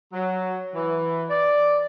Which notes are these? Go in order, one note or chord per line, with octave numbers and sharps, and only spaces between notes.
F#3
E3
D5